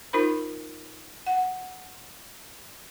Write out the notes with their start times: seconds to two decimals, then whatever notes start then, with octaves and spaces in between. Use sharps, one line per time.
0.13 D#4 F4 A#4 C5 B5
1.26 F#5